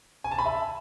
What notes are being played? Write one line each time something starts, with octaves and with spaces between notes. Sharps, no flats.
G#5
A5
B5
E5